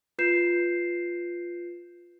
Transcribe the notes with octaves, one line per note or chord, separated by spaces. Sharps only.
F4 B4 G6 C7 E7